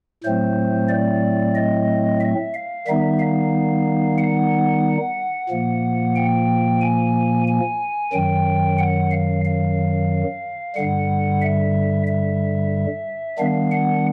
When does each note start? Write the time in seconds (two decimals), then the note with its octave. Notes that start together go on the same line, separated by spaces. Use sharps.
0.24 A2 F#3 A3 C4 C5
0.89 D5
1.55 D#5
2.21 E5
2.54 F5
2.87 D#3 G3 B3 D#4 E5
3.19 F5
4.18 F#5
5.49 A#2 F3 A#3
6.15 G5
6.81 G#5
7.47 G#5
8.13 F#2 D#3 F#3 G5
8.78 F#5
9.11 F5
9.45 F5
10.76 G2 D3 G3 F#5
11.42 E5
12.07 E5
13.38 D#3 G3 B3 D4 F5
13.71 F#5